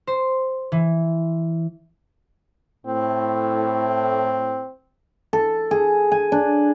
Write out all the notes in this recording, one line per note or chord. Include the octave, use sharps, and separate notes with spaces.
C5
E3
A2 C4
A4
G#4
G#5
D4